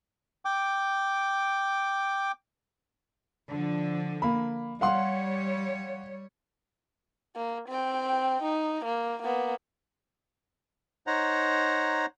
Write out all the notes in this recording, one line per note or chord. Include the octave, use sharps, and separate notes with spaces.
G5 D6
D3 F3
A#3 B5
G3 C#5 F5 F#5 C6
A#3
C4 G5
D#4
A#3
A#3 B3
D#4 C5 C#5 F#5 A#5